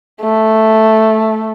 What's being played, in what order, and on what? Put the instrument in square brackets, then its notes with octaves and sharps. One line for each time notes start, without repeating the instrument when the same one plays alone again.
[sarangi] A3